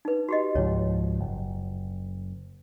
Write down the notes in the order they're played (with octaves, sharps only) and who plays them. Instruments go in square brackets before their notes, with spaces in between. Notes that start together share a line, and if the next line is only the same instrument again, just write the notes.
[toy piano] D#4 B4
F#4 G4 D#5
[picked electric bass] C#2 G#2 F3 [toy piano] C#5
[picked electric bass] F#1